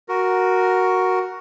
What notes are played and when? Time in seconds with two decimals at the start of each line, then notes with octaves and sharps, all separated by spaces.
0.08 F#4 A#4